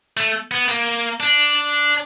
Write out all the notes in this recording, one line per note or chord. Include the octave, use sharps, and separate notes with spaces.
A3
B3
A#3
D4